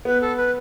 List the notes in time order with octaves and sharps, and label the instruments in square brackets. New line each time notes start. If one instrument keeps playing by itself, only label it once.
[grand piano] B3 [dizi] B4
[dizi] A4
B4